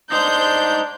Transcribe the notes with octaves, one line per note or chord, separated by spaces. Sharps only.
D4 D#4 C5 G6